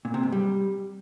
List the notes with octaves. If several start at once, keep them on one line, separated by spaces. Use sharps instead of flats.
A#2
C3
G#2
G3